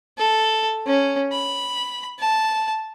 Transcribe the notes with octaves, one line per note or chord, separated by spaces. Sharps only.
A4
C#4
B5
A5